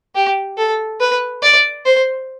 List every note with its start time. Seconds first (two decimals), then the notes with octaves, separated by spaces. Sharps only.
0.15 G4
0.58 A4
1.00 B4
1.43 D5
1.85 C5